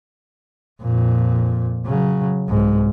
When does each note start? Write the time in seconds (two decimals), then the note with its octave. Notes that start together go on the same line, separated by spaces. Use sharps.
0.82 F2 A#2
1.86 C#3 F#3
2.48 C2 G#2